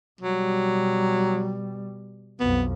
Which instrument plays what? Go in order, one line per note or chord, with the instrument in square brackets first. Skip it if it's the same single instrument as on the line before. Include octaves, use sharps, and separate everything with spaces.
[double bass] B2 G3 [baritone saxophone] F#3
[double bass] B1 F2 [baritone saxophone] B3